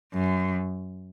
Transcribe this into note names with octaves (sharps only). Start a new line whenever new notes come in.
F#2